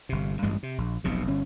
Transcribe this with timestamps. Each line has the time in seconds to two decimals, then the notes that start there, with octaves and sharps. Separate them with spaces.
0.09 G1 C3
0.42 A1 G2 G#3
0.63 C3
0.78 A#1
1.04 F1 B1 C3
1.28 G1 C#4